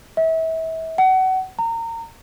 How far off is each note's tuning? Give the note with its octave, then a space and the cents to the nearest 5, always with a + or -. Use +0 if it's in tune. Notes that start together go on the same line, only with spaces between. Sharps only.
E5 -35
F#5 +30
A#5 -25